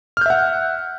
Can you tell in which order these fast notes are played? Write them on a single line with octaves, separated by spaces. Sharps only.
F6 G6 E5 F#5